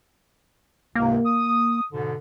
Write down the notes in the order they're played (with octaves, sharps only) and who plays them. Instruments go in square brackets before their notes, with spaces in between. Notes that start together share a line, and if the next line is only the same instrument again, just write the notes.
[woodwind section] C#2 G#2 C3 [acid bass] A#3
[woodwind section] D#6
G#2 B2 D3